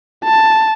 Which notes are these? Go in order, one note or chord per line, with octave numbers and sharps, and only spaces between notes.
A5